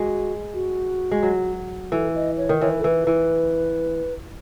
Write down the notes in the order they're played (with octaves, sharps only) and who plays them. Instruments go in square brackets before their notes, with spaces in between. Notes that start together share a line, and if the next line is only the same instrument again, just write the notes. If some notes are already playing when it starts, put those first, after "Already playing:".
Already playing: [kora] G#3 [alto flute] F#4
[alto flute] F#4
[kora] G#3
F#3
[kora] E3 [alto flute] A4
[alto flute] D#5
C#5
[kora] D#3
[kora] E3 [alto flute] C#5
[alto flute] B4
A4
[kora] E3 [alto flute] B4
[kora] E3